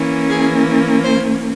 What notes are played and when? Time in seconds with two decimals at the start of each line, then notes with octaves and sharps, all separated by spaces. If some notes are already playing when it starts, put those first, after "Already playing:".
Already playing: E3 A#3 C#4
0.29 G#4
1.04 C5